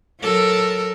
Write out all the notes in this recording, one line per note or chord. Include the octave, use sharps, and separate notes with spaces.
F#3 A4 A#4